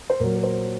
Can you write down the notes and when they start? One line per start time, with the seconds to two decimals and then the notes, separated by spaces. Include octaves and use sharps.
0.10 C5
0.20 A#2 F#3 A#4
0.36 A#4
0.43 C5